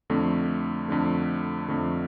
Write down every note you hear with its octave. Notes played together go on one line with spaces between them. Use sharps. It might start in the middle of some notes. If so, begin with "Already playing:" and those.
F2 D3 A3
F2 D3 A3
F2 D3 A3